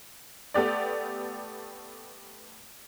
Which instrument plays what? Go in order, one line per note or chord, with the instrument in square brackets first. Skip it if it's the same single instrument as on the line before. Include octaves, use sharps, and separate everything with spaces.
[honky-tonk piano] A3 B3 G4 D5